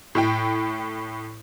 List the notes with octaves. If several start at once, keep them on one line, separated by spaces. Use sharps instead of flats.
A2 E4 G5